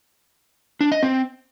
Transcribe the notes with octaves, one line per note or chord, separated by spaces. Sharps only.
D4
D#5
C4